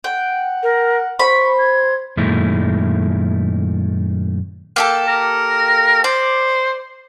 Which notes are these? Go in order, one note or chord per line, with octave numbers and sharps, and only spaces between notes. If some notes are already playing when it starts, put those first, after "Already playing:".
F#5 G5
A#4
C5 B5 C#6
G#6
F#2 A#2 D#3 G#3 A3 E4
A#3 G4 A4
A#4
C5 D5